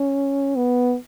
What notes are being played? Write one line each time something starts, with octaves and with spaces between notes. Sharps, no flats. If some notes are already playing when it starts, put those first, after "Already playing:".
Already playing: C#4
B3